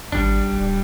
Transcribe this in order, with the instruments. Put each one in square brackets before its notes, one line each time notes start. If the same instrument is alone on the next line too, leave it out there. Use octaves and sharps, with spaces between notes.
[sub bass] G#1 [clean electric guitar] G3 D4
[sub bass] D1